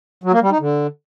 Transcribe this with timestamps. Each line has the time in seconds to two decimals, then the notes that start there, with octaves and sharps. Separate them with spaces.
0.24 F#3
0.33 A#3
0.42 G3
0.51 D#4
0.60 D3